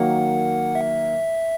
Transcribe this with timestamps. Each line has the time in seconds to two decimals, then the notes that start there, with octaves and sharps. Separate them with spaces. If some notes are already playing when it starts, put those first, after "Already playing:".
Already playing: D#3 F#3 A#3 F#5
0.75 E5